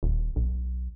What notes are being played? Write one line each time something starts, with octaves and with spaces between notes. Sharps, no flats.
D#1
B1